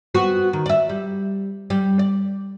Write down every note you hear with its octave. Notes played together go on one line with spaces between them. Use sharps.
B3 C4 F#4
D#3
D5 E5
G3
G3
D5